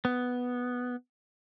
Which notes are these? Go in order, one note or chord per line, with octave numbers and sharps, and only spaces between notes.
B3